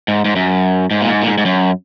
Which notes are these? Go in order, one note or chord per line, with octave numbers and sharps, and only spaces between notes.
G#2
G#2
F#2
G#2
A#2
G#2
A#2
G#2
G#2
F#2